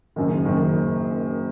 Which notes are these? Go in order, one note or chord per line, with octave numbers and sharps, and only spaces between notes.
F#1 F#2 D#3
F#1 F#2 D#3